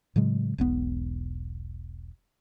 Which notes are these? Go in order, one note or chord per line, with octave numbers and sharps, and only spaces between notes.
A2 C#3 F#3 G#3
E1 B1 B3